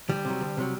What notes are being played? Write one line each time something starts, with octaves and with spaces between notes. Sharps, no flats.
D2 G3
C3 F#3
D2
C3 F#3